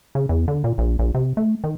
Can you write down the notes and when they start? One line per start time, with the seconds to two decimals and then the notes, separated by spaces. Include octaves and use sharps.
0.15 C#3
0.29 E2
0.48 D3
0.64 A#2
0.78 A#1
0.99 A#1
1.15 C3
1.37 A3
1.64 D#3